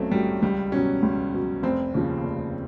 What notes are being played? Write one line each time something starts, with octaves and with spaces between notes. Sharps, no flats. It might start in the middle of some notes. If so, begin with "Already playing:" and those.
Already playing: B1 F#3 A3 C4 C#4
A2 F#3 G3
C#2 G3
B2 F#3 C#4
C#2
B2 F#3
F1 C4
D#2 C#3 F3
F1